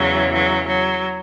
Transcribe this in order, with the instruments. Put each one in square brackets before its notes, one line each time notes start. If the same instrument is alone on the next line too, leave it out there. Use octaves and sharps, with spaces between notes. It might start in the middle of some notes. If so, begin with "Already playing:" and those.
Already playing: [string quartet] E2 C#3 E3 F#3
F#3
F#3